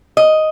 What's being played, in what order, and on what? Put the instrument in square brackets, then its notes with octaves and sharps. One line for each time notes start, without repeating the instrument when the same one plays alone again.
[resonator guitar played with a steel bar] D#5